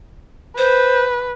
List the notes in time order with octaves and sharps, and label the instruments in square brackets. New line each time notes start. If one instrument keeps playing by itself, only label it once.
[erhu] B4 [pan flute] C5